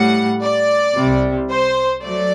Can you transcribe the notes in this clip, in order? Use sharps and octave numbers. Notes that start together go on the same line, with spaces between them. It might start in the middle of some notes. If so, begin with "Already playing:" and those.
Already playing: A2 G3 F#5
D5
C2 C3 G3
C5
F#3 A3 D5